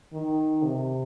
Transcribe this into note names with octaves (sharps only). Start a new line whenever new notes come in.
D#3
C3